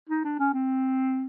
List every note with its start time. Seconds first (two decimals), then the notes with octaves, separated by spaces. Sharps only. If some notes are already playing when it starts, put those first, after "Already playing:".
0.10 D#4
0.25 D4
0.39 C#4
0.54 C4